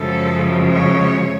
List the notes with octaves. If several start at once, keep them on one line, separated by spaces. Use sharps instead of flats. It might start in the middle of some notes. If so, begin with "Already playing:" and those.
Already playing: F#2 C#3 F3 G#3 A4
C#5